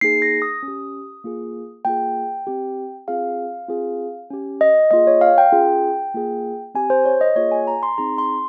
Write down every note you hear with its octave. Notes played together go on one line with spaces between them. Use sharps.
A#3 D#4 G#4 C7
A#6
D#6
C#4
G4
A#3 F4 G#4
A#3 F4 G#4 G5
C4 G4
C4 F4 G#4 F5
C4 F4 G#4
C#4 G4
D#5
A#3 F4 G#4 D#5
C#5
F5
G5
C#4 F4 G#4
A#3 F4 G#4
C4 G4 G#5
C5
C#5
D#5
A#3 F4 G#4 C#5
G#5
A#5
C6
C4 D#4 G#4 A#5
C6